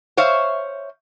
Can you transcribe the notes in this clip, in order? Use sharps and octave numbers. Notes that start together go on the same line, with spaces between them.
C5 C#5 E5 F5